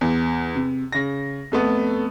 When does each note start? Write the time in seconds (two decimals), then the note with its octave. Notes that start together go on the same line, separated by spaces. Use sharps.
0.01 E2
0.56 C3
0.92 C#3 A#6
1.52 F2 A3 B3